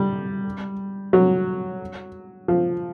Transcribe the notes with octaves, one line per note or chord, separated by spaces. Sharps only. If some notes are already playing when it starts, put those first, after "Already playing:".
Already playing: G3
F#3
F3